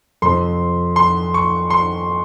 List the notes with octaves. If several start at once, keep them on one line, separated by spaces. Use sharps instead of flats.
F2 C3 F3 C4 C6
C6
C#6
C6